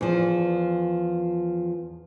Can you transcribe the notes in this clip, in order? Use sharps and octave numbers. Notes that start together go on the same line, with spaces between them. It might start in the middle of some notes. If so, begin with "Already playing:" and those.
E2 F3